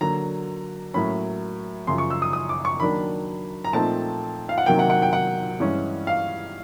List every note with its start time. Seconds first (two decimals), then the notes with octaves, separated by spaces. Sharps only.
0.01 D3 F#3 A#3 A#5
0.94 A2 F#3 A#3 C#4 B5
1.87 F#2 C#3 F3 C6
1.98 C#6
2.10 E6
2.22 D#6
2.33 D#6
2.49 D6
2.65 C#6
2.80 D#3 F#3 A#3 D4 B5
3.65 A#5
3.73 A#2 F3 A3 C4 D#4 A5
4.49 F5
4.58 F#5
4.66 C3 D#3 F#3 A#3 G5
4.79 F#5
4.90 F#5
5.02 G5
5.13 F#5
5.60 G2 E3 G#3 C#4
6.07 F5